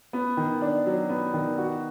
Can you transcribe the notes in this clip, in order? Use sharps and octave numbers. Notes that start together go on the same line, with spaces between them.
B3
D#3
D4
F#3
B3
D#3
F#4